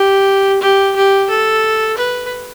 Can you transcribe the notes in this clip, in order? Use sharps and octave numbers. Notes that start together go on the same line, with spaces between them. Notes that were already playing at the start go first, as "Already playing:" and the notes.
Already playing: G4
G4
G4
A4
B4